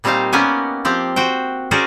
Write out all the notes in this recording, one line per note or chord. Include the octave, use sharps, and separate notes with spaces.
A#2 G3 C4 D#4 C5 F5
A#3 B3 C#4 G4 F#5 G#5
F3 C4 G4
F#4 C5 G5
C#4 F#4 G#4 A#4 C5 D5